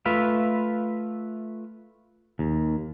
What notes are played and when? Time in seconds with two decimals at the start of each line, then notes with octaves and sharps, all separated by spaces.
0.06 A3 F4 B4 E5 F5
2.39 D#2